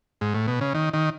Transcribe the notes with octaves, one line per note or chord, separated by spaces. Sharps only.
G#2
A2
B2
C#3
D#3
D#3